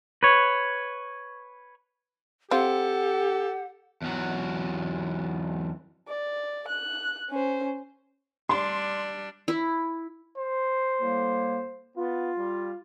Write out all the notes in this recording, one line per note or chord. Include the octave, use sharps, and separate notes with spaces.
B4 C#5
C4 F4 G4 A4 F#5
E2 F#3
D5
F#6
C#4 C5
G3 D4 C6
E4
C5
A2 G3 A#3
B3 F4
G3